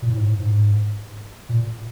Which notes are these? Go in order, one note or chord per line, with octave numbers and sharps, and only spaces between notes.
A#2
A2
G#2
A2
G#2
A#2